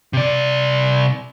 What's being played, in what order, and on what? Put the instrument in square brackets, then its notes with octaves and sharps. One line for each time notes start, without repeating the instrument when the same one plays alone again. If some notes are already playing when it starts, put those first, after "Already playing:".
[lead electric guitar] C3 D5